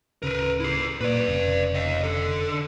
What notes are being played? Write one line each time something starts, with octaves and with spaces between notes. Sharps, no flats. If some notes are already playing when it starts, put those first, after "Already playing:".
D1 C#3 A#4 B4
E4 G#4
A#2 B4 D5
F1 C#3
D#5 F5
D3 A4